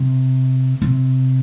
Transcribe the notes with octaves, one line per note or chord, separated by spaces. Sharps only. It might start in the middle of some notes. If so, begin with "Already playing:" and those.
Already playing: C3
C3